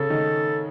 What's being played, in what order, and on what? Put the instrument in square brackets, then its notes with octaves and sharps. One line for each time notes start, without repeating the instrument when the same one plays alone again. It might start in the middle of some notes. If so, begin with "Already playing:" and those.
Already playing: [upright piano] C#3 C#4 [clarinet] A4
[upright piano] D#3 D#4